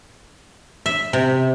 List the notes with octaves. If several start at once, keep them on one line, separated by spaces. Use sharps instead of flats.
E5
C3